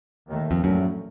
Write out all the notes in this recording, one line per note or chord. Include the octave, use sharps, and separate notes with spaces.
D#2 D#3 A3
F2
A#1 F#2 A2 F#3 A3